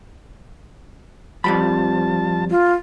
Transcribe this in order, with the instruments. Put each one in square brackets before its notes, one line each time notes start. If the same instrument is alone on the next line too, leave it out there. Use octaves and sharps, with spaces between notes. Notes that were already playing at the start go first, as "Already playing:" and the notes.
[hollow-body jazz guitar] F2 G3 B5 [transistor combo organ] F3 A5
[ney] F4